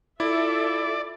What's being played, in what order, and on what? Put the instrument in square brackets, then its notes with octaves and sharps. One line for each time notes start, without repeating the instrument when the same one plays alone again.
[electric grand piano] E4 [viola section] F4 A4 E5 [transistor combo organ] D5